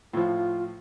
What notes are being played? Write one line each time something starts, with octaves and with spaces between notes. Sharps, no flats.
A2 F3 F4